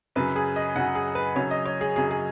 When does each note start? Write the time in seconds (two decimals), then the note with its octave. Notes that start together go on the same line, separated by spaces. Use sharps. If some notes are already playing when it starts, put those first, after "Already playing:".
0.16 F#2 C#3 F#3 B4
0.36 G#4
0.56 D#5
0.75 F#2 C#3 F#3 F#5
0.95 G#4
1.15 B4
1.35 F#2 C#3 F#3 C#5
1.51 D#5
1.66 C#5
1.81 G#4
1.96 F#2 C#3 F#3 G#4
2.11 G#4